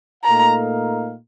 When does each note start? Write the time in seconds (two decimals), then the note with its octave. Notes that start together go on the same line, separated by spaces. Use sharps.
0.24 A#2 A3 D#4 A#4 F5 A#5